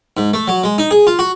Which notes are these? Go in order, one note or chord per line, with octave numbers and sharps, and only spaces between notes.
G#2
A3
F#3
G#3
D#4
G#4
F4
F#4